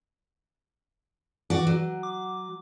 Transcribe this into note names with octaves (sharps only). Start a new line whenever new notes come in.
E3 F#4 D5
F#3
D6